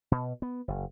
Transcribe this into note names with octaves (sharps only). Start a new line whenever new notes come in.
B2
B3
F#1